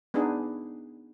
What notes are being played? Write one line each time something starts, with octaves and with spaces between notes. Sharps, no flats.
B3 D4 D#4 G#4